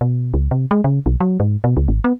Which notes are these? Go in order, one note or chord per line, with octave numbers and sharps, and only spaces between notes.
B2
C#2
C3
G#3
C#3
B1
F#3
G#2
B2
C#2
G#1
B3